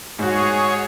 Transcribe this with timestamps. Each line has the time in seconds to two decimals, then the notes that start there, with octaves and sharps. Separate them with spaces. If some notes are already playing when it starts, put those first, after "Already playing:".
0.19 G#2 F#4 G#4 C#5